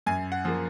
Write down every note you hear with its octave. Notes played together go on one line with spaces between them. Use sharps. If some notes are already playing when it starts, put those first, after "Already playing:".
F#2 G#5
F#5
F3 A#3